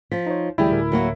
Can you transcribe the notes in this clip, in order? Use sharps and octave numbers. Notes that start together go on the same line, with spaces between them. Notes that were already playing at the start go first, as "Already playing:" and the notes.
F3 B6
D#4 C5 C#5
D2 E3 F#3 G3 E4 G4 G#4
D2 A2 A#4
F#3 A#3 F#4